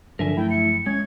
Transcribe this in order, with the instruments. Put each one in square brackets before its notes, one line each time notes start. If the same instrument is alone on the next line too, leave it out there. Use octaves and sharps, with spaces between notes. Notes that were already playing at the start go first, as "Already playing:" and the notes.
[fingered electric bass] G2 F3 F#3 [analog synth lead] D3 [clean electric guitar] A#4 E5 G#5
[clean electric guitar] A3 [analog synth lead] E4 [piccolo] G5
[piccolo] C#7
[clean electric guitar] G#3 [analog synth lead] C#4 [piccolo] G#6